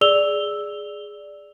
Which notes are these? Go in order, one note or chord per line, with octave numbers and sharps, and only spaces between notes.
G#4 D5 E6 F7 G7